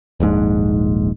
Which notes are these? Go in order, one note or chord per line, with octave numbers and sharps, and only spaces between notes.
D#1 A#1 G#2 G#3